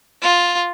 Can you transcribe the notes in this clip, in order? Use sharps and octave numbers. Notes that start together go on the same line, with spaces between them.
F4